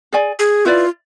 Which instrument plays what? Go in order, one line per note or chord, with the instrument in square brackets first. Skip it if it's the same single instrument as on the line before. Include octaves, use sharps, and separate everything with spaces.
[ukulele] G#4 D5 G#5
[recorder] G#4
[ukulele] E4 B4 D5 [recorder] F4